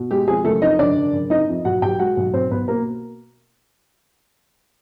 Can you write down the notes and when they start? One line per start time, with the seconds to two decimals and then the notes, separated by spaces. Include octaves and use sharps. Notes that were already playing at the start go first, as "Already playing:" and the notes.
Already playing: B2
0.11 G#3 G4
0.28 F2 G#4
0.44 F#1 A3 A4
0.62 F2 D#4 D#5
0.79 F#1 D4 D5
0.96 F#1
1.13 F#1
1.30 C3 D#4 D#5
1.48 F2
1.65 B1 F#4 F#5
1.82 B1 G4 G5
1.99 G#3 F#4 F#5
2.17 B1
2.34 B1 C4 C5
2.51 B1 B3 B4
2.68 B2 A#3 A#4